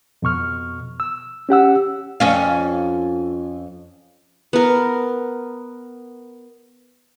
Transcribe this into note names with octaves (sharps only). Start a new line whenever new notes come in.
F2 B2 C#6 F6
E6
C#4 G4 F#5 E6
F2 C#4 F5
B3 A#4